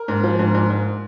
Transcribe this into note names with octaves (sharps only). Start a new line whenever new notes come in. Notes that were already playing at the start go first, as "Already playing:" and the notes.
Already playing: A#4
G#2
F3
G#2
G#2
G#2